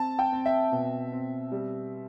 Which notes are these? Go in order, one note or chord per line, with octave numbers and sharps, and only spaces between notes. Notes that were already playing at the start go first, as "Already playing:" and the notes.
Already playing: C4 A5
G5
C4
E5
B2
C4
G3